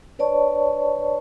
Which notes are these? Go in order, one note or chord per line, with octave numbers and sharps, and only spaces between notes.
D4 B4 C#5 D5 A5 C#6